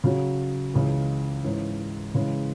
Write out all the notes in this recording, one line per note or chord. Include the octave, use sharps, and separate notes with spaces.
C#3 F#3 C#4 F#4
C#2 C#3 E3
G#2 E3 C#4
C#3 E3 G#3 C#4